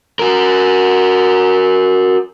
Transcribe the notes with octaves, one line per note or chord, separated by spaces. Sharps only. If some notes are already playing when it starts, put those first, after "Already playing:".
F#4 A#4